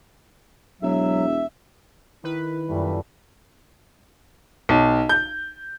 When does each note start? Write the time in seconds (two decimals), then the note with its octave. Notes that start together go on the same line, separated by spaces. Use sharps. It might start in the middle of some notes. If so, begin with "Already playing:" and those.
0.82 E1 F#3 E5
2.24 D#3 E4 B4
2.69 F#2 A#2 G3 A3
4.69 B1
5.09 G6